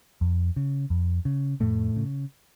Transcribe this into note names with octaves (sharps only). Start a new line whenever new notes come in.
F2
C#3
F2
C#3
F2 A2 A3
C#3